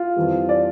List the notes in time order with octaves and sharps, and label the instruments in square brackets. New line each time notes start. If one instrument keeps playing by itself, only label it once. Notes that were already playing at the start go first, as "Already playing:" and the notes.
Already playing: [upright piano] F4
F2 E3 G3
D5